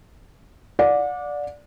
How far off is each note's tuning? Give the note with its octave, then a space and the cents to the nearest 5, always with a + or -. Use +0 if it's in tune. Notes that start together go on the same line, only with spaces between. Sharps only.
D5 -5 F#5 -40